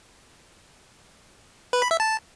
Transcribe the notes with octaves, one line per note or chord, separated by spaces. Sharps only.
B4
B5
E5
A5